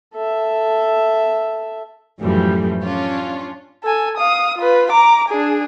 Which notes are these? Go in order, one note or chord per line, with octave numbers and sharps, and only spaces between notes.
A4 E5
F#2 A2 E3 F3 G3 A3
C#4 D4 F4 C#5
A4 G#5
F5 D#6
F4 B4
A#5 D6
D4 G#4